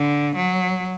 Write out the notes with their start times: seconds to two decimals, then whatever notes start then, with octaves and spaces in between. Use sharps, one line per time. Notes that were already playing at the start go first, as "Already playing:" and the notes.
Already playing: D3
0.36 F#3